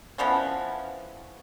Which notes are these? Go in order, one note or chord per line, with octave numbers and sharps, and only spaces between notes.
E3 F3 B3 C#4